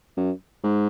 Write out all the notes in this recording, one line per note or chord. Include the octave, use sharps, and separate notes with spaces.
F#2
G#2